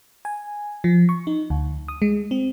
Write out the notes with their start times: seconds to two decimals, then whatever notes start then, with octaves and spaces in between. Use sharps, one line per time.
0.25 G#5
0.84 F3
1.09 C#6
1.27 D#4
1.50 D2
1.88 D#6
2.02 G#3
2.31 C4